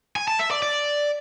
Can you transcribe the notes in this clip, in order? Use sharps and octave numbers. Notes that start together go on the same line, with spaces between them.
G#5
A5
E5
D5
D5